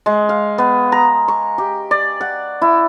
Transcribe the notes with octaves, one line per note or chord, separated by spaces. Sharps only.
G#3
F5
B3
A#5
C#6
G4
D5
F#5
E4